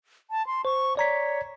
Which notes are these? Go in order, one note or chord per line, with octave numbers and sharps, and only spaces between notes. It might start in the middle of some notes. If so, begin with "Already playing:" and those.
A5
C6
C5 C#6
C#5 D5 A#5 B6